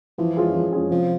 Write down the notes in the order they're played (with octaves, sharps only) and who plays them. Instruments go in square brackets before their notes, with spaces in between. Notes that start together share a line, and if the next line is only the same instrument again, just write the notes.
[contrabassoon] E3 [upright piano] F3
[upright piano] G#3 C#4 F4 G#4
F3
G#3 C#4 F4 G#4
[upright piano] C3 [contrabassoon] F3